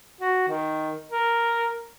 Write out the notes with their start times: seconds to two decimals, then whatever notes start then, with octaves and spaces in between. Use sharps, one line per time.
0.21 F#4
0.48 D#3
1.11 A#4